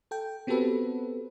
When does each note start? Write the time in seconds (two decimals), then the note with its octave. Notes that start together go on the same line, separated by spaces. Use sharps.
0.11 A4 G5
0.47 B3 C4 F#4 G4 A4 B4